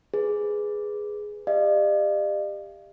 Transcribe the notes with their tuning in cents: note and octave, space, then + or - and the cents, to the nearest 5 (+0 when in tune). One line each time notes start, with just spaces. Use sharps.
G#4 +0 B4 +5
G4 +25 D5 +45 F5 -40